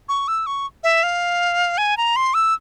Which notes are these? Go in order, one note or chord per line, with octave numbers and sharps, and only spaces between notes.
C#6
E6
C#6
E5
F5
G#5
A#5
C6
E6